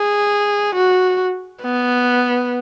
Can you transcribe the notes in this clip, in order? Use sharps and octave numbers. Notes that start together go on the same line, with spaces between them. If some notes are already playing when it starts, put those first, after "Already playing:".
Already playing: G#4
F#4
B3